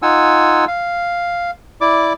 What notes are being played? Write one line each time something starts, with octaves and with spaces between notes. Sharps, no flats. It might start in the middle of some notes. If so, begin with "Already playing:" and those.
D#4 F4 F#5 G#5 E6
F5
E4 D5 D6